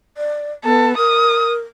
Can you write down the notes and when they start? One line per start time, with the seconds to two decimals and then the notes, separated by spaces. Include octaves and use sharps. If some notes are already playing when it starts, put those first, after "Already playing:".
0.17 D5
0.64 B3 A4
0.97 A#4 D#6